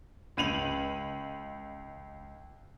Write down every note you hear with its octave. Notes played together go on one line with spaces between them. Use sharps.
C#2 D#7 F7 F#7